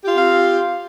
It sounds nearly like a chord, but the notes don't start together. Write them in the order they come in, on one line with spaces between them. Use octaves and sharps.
G4 F4 C4 F5